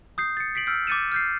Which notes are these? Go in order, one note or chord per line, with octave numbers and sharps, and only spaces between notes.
D#6 G6 C7
A6 C#7
B6 C7 D7 F#7
E6 F6 G6 D7
D6 G6 A6 C#7 D#7 E7
F6 G6 C7